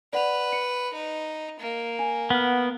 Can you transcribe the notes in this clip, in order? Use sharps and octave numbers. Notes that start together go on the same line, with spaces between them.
B4 D5 F#5 F7
C#7
D#4
A#3
G#5
B3 F#5 F6